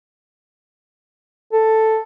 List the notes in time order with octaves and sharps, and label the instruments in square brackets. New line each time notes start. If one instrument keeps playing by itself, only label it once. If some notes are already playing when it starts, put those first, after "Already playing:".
[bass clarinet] A4